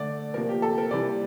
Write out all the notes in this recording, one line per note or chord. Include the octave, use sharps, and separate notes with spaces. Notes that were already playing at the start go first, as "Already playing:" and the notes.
Already playing: D3 A3 D5
C3 F3 A#3 A#4
G4
A4
A#4
C3 E3 G3 A#3 D5